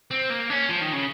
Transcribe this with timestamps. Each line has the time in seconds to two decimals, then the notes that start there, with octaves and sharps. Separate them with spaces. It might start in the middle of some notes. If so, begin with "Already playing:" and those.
0.11 C4
0.30 A#3
0.50 C#4
0.69 F3
0.81 D#3
0.93 C#3